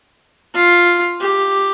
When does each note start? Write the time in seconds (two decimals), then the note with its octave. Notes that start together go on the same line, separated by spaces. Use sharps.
0.54 F4
1.20 G4